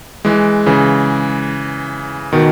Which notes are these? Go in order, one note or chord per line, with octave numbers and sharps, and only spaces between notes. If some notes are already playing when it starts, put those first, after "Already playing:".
E3 G#3
C#3 E3
B2 D#3